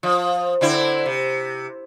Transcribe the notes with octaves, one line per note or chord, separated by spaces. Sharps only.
F3
D3 C4 E4
C3